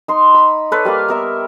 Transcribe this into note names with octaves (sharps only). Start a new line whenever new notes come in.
D#4 C6
B5
A4 B4 C#5 D5
G3 A#3 D5 F5
B3 A#4 E5